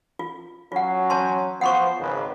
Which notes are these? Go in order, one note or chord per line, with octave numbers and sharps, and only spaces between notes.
F4
F#3 C#4 F4 F#5
C#5 A5 C6
F3 B3 C5 F#5 C6 C#6
G#1 C#3 B4